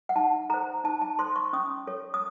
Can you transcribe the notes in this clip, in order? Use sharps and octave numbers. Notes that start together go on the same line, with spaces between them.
F#5
D#4 A5
A4 C5 A#5
D#4 A5
A5
A4 C5 C6
C#6
C#4 D#6
A4 C#5
D#6